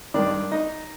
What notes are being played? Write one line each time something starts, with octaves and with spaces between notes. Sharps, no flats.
G2 D#3 D4 D5
D#4 D#5